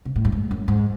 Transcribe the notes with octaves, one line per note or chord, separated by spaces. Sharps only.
C3
A2
F#2
G#2
F#2
G#2